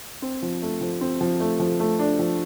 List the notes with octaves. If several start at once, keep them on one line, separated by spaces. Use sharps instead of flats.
C4
F3
A3
F3
C4
F3
A3
F3
A3
D4
F3